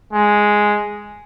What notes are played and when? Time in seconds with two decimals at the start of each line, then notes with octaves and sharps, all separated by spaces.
0.13 G#3